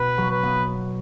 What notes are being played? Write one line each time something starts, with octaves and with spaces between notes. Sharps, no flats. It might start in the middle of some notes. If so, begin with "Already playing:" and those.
Already playing: B2 B3 B4
F#3
B4
B3